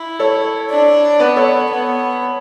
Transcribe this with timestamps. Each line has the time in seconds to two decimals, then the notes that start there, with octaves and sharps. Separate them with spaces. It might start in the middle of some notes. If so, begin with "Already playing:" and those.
Already playing: E4
0.19 A4 C#5
0.70 D4
1.20 B3 B4 D5
1.36 A4 C#5
1.70 B3